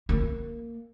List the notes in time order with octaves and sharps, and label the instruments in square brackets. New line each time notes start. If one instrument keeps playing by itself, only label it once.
[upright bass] A#3